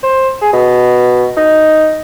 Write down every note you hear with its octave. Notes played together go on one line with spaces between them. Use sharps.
C5
G#4
B2
D#4